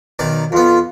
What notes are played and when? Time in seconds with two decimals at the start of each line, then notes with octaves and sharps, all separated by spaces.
0.19 B1 D#3 D5
0.52 F2 B3 F4